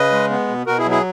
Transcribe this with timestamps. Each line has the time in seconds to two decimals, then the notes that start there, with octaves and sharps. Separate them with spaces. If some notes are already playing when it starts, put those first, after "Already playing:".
Already playing: C#3 B4 D#5
0.12 G#3
0.30 B3
0.48 B2
0.66 B2 F#4 A#4
0.78 E4 G#4
0.85 F#3
0.91 E4 G#4